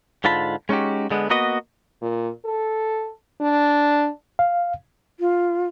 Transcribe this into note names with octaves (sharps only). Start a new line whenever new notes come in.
G#2 D3 F4 A5 B5
G#3 C#4 D#4 F#4 G4
D3 G#3 B3
A#3 B3 F#4 B4 D#5
A#2
A4
D4
F5
F4